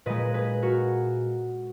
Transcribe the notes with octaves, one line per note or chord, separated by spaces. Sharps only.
A#2 G#3 B4 D#5
G#4 B4
F#4 A#4